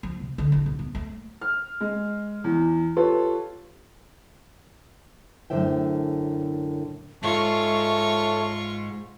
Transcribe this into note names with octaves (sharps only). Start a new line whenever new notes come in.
F3
C3
D3
A1
B1
B3
A3
F6
G#3
E2
F4 G4 A4 B4 C#5
F#2 A2 D3 C5 E5 G5
G#2 F4 A4 C#5 E5 C#6